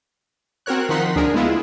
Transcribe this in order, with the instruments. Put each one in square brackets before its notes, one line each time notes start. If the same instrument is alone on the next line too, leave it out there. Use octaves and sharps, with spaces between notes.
[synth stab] C4 F#4 A#4 C#5 F#6
D#3 F3 D#4 F#5 C6 B6
D2 D4 G#4 A#4
G#3 B3 E4 F4 G#4